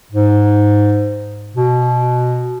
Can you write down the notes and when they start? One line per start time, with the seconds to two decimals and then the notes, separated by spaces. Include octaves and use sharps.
0.12 G#2
1.55 B2